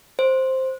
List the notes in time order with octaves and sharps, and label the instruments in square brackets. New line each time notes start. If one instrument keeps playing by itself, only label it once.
[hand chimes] C5